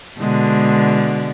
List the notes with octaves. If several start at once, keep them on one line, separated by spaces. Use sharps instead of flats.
B2 D3 G#3